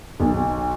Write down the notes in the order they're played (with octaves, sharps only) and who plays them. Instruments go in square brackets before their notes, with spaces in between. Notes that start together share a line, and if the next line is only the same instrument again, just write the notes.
[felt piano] B1